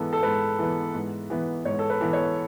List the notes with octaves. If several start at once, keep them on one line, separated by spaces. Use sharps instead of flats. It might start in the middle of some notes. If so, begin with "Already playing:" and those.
Already playing: G#2 E3 B3 A4
A4
G#2 B4
E3 B3
G#2
E3 B3
G#2 C#5
A4
B4
E3 B3
C#5